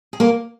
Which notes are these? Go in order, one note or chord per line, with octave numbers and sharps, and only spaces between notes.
G#4
A#3 A#4